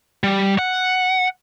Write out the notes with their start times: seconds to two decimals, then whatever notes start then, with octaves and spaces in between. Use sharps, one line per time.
0.24 G3
0.59 F#5